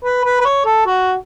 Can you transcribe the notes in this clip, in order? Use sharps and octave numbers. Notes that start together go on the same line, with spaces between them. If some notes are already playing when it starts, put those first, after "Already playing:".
B4
B4
B4
C#5
A4
F#4